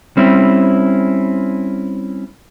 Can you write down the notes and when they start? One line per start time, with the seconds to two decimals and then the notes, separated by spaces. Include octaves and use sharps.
0.17 G3 C4 C#4 E4